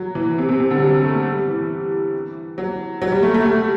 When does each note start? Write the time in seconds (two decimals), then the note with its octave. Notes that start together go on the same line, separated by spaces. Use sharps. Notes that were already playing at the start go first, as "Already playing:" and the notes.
Already playing: F#3
0.15 E3
0.38 C3
0.49 C3
0.60 C3
0.70 D3
0.77 G3
0.81 F#3
1.04 A3
1.25 G3
1.48 E3
2.58 F#3
3.02 F#3
3.12 G3
3.23 A3
3.34 A3
3.46 A3